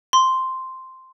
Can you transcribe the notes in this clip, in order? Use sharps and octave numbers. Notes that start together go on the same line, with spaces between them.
C6